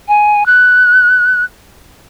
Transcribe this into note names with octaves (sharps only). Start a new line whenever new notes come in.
G#5
F#6